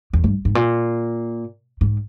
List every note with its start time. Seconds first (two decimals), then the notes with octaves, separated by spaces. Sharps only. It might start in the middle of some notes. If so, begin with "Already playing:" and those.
0.13 E2
0.24 G2
0.45 G#2
0.55 A#2
1.81 G#2